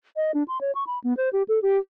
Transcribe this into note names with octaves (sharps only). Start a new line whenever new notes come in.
D#5
D4
C6
C#5
C#6
B5
B3
C5
G4
A4
G4